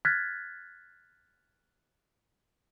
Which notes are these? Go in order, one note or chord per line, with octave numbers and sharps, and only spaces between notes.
F6 F#6 G#6 A6 B6